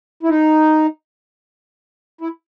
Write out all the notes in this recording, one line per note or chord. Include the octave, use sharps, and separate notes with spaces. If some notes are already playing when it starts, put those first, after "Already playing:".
E4
D#4
E4